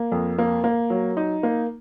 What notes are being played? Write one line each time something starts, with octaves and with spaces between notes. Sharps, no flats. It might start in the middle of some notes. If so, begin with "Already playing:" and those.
Already playing: A#3
F2
A#3
A#3
F#3
D#4
A#3